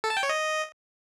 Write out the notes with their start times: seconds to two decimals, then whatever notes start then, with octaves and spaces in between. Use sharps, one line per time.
0.04 A4
0.10 A5
0.17 G5
0.23 C#5
0.29 D#5